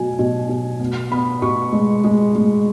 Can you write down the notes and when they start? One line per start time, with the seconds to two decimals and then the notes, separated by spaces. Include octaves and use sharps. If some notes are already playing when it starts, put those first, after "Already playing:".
Already playing: B2 F#3 G#5
0.19 B2
0.49 B2
0.80 B3
1.11 B3 B5
1.42 B2 C#6
1.72 G#3
2.04 G#3
2.35 G#3